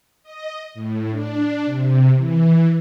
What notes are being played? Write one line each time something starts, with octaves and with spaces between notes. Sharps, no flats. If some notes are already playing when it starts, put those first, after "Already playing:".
D#5
A2
D4
C3
E3